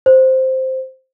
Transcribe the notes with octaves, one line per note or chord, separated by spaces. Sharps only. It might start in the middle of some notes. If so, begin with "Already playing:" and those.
C5